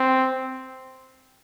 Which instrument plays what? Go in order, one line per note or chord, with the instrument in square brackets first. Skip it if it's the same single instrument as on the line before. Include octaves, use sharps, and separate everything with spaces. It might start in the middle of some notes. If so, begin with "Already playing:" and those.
Already playing: [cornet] C4